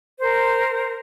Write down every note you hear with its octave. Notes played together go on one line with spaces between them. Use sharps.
A#4 C5